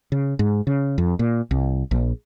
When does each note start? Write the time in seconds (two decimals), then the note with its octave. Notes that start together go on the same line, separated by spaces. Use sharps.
0.12 C#3
0.39 G#2
0.67 C#3
0.98 F2
1.19 A#2
1.51 C2
1.91 A#1